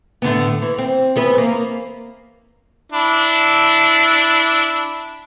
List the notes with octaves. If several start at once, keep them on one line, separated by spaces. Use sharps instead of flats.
A2 D3 B3
E3
C4
E3 B3 B4
A#3
D4 E4